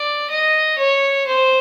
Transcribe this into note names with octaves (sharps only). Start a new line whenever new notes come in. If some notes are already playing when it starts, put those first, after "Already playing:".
Already playing: D5
D#5
C#5
C5